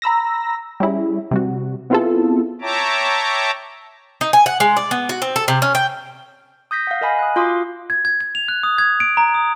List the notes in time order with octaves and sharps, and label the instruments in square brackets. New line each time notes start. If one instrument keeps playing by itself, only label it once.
[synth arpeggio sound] A#5 B5 E6 A#6
G3 C#4 E4 G#4
C3 G3 F#4
B3 C4 E4 F4 G#4 A4
[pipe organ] C#5 E5 G5 A5 A#5 D6
[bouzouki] D#4
G#5
F#5
G#3
D5
B3
F#4
C4
A4
C3
C#4
G5
[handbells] D#6 G6 A#6 B6
F5 F#5
A#4 D#5 F5 G#5 B5
D#6 F#6
F4 F#4 F5 C6 D6 D#6
[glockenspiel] G#6
G#6
G#6
F7
F#6
D#6
G#6
D7
A#5
D#6